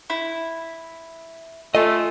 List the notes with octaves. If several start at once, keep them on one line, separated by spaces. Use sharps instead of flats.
E4
A3 F4 A4 D#5 G#5